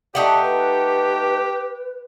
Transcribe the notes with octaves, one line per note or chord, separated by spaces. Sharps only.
A3 D#4 G4 D5 F#5
B4